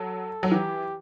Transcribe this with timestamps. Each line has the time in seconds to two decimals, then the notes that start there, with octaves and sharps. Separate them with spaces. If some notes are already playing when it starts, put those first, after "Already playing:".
Already playing: F#3 A4
0.43 F#3
0.51 E3 G4